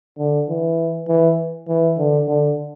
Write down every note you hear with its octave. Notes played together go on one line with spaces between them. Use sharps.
D3
E3
E3
E3
D3
D3